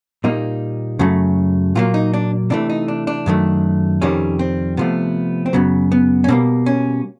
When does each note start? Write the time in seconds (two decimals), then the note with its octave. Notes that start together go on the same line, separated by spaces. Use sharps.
0.24 A#2 G3 A#3 D#4
0.99 F#2 C#3 F#3 A3
1.75 A#2 F#3 A#3 F4
1.94 D#4
2.14 D4
2.50 C3 E3 A3 D4
2.70 D#4
2.88 D4
3.07 D4
3.26 F#2 D#3 F#3 A3
4.02 F2 C3 D#3 G3 C#4
4.39 C4
4.77 C3 F3 A3 B3
5.46 C4
5.53 F#2 C#3 F#3 B3
5.92 B3
6.24 C#4
6.28 B2 G3 A#3 C4
6.66 C#4